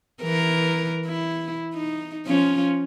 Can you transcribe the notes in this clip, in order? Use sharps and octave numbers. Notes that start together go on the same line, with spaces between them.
E3 A#4
E4
D#4
F3 C#4 F4